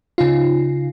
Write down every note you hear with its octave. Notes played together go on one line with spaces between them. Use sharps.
C#3 D#4 F4